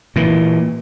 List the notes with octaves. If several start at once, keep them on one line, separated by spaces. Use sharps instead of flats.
A#2 E3